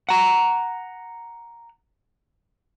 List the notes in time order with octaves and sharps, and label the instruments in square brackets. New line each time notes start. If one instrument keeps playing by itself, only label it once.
[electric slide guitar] F#5 A#5